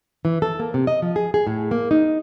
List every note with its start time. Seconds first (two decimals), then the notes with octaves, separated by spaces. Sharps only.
0.25 E3
0.42 A4
0.60 A#3
0.74 C3
0.87 D#5
1.02 F3
1.16 G#4
1.34 G#4
1.47 A2
1.71 A#3
1.91 D#4